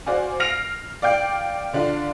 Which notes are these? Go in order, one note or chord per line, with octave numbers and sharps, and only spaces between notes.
F#4 C5 D5 F5 G#5
F6 A#6 C7 D7 F7
D5 F5 G5 G6
D3 D4 F4